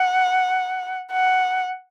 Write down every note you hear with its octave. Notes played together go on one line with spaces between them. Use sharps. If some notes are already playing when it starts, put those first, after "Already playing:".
Already playing: F#5
F#5